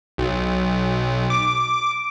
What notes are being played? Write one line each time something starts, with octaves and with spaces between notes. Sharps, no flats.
B1
D6